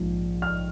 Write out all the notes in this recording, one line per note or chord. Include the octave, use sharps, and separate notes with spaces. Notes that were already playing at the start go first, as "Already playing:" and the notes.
Already playing: A#1 G#2 F3
F6